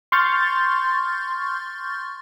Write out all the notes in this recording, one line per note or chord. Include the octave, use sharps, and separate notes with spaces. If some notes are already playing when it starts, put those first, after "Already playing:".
C6 C#6 F6 G6 A6